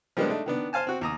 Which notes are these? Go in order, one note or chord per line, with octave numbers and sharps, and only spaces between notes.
F3 G3 G#3 A#3 B3 D4
A3 D4 D#4
D#3 B3 D4
C5 F5 G#5 A5
C4 F#4
D#2 A#5 D#6